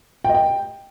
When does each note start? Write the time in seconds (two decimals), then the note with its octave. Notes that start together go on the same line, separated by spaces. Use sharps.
0.24 G5
0.29 D#5
0.35 G5